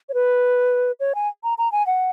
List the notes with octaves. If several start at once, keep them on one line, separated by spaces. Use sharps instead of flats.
C#5
B4
C#5
G#5
A#5
A#5
G#5
F#5